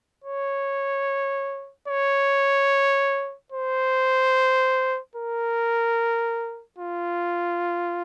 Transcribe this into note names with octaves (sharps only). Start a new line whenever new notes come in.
C#5
C#5
C5
A#4
F4